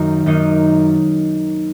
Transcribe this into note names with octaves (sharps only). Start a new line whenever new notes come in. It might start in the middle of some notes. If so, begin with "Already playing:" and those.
Already playing: F#2 D#3 A#3 D#4
F#2 D#3 A#3 D#4